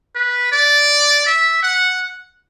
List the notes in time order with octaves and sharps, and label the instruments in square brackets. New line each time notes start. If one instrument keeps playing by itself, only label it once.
[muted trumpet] B4
D5
E5
F#5